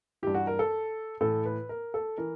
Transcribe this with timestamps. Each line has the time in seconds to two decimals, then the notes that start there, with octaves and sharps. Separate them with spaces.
0.22 G2 E3 G4
0.34 F#4
0.47 A#4
0.59 A4
1.21 A2 E3 A4
1.45 B4
1.69 A#4
1.94 A4
2.18 E3 A#4